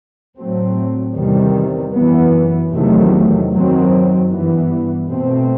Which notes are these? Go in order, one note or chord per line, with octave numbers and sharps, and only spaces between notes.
A2 F#3 A3 C4
E2 C3 D#3 G3
F#2 E3 B3
E2 C3 D#3 F#3 A3
F#2 D#3 F#3 C4
G2 E3 B3
B2 A3 C4